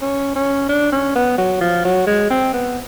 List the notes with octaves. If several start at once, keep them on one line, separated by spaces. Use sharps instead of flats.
C#4
C#4
D4
C#4
B3
F#3
F3
F#3
G#3
C4
B3